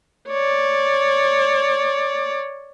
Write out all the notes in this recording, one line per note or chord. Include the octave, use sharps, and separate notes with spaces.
C#5 D5